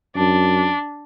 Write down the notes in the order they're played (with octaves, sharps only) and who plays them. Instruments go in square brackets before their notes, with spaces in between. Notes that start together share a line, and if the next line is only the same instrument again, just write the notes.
[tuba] F#2 [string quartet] D4